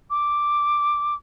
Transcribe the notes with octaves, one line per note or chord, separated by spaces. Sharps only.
D6